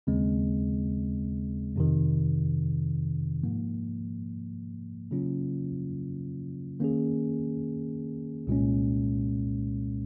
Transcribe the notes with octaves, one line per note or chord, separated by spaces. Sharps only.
D#2 C#3 G#3 C4
F2 C3 D#3
G#2 F3 A#3
C#3 F#3 A#3 C#4 F4
D#3 A#3 C#4 G#4
C2 A#2 G#3 C#4